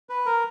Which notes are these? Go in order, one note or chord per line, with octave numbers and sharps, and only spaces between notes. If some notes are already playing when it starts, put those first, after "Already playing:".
B4
A#4